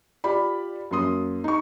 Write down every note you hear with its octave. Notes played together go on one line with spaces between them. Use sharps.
F4 G4 D5 B5
F#2 A#3 C6 D#6
D#4 C#6